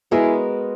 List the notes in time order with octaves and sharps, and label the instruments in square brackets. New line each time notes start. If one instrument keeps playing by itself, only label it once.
[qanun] G#3 B3 F#4 A#4 [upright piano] E4 G#4